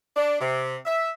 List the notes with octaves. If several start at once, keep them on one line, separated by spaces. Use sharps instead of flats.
D4
C3
E5